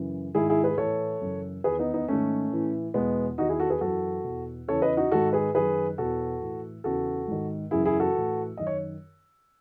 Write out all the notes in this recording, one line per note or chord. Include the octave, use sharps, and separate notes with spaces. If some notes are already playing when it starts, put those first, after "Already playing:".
Already playing: F#2 C#3 E3
G#2 D#3 E4 G#4
E4 G#4
G#4 B4
A2 E3 A4 C#5
F#2 C#3 E3
E2 D#3 G#4 B4
B3 D#4
B3 D#4
G#2 D#3 A3 C#4
A2 E3
E2 B2 G#3 B3
E2 D#3 D#4 F#4
E4 G#4
F#4 A4
G#4 B4
F#2 E3 F#4 A4
E2 B2
E2 C#3 E3 A4 C#5
B4 D#5
D#4 F#4
G#2 D#3 F#4 A4
G#4 B4
F#2 D#3 G#4 B4
E2 B2 F#4 A4
A2 E3
E2 C#3 E3 F#4 A4
G#2 D#3
F#2 C#3 E3 E4 G#4
E4 G#4
F#4 A4
A2 E3
F#2 D#3 D#5
C#5